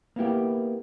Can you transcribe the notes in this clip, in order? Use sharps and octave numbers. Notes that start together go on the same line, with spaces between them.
A#3 B3 E4 G4